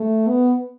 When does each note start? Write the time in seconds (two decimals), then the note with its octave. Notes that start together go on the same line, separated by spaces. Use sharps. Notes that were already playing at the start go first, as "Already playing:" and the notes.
Already playing: A3
0.28 B3